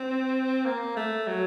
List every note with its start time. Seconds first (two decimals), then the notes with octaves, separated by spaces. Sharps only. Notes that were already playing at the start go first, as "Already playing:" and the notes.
Already playing: C4
0.65 A#3
0.97 A3
1.27 F#3